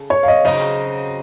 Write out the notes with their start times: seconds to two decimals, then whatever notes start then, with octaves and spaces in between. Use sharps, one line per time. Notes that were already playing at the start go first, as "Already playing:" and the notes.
Already playing: C#3 A4
0.10 C#5
0.23 F5
0.28 D#5
0.45 C#3 F#3 C4 D#4 D#5